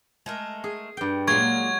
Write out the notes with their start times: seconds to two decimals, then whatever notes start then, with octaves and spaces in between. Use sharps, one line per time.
0.26 G#3 A3 A#4
0.64 G#4
0.97 G2 G5
1.27 A#2 F#3 G#3 A#3 G#4 C#6 G#6